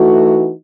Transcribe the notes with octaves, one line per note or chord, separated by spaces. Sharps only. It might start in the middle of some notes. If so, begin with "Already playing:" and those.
Already playing: E3 A3 D#4 F#4